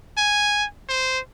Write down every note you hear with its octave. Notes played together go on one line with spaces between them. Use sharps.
G#5
C5